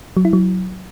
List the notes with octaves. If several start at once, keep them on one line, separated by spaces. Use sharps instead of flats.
F#3
E4
F#3